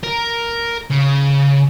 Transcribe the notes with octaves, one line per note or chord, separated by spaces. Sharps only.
A#4
C#3